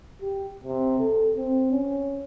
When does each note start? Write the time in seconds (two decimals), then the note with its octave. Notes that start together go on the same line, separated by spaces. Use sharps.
0.21 G4
0.64 C3
0.99 A4
1.37 C4
1.71 C#4